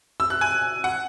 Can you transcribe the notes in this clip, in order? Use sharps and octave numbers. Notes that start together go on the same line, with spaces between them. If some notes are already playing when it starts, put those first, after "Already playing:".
E6
F#6
G#5
F#5